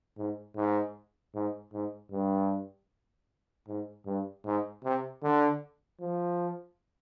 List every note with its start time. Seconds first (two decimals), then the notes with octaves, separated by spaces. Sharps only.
0.18 G#2
0.56 G#2
1.35 G#2
1.73 G#2
2.11 G2
3.68 G#2
4.06 G2
4.45 G#2
4.84 C3
5.23 D3
6.00 F3